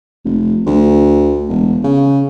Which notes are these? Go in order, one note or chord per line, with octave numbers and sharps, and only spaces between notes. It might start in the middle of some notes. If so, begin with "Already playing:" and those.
F1
D2
E1
C#3